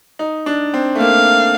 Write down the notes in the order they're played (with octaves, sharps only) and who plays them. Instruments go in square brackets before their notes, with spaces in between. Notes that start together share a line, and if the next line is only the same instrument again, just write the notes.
[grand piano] D#4
D4
C4
A3
[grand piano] A#3 [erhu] F5